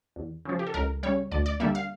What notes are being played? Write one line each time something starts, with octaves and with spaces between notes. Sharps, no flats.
E2
C#3 F3
G4
A4
C#2 A#4
C#3 G3 C#5
D2 D5
D5
D3 G3 A#3 E5
F5